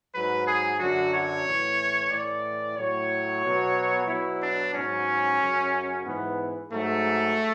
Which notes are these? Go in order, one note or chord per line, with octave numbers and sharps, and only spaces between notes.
G#2 F#3 B4
G#4
F#2 D3 F#3 F#4
C#5
A2 E3
A2 E3 D5
A2 F#3 C#5
B2 F#3
B2 F#3 E4
D4
G#2 F#3 C#4
F#2 C#3 F#3
G#2 E3 B3
G#2 F#3 A3